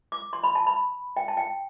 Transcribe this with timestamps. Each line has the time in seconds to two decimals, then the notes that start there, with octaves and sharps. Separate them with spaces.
0.12 D6
0.33 C6
0.44 B5
0.55 A5
0.67 B5
1.17 G5
1.28 A5
1.37 G5